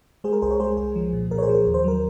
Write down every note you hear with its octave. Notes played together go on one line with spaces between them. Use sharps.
G#3 G#4 C5
A#4
C2 G#4 C5
A#4 C#5
G#3 G#4 C5
C2 G#4
F3
A#2
A#2 A#4
C#5
G#4 C5
F3
A#4
D#2
C5
F#3 A#4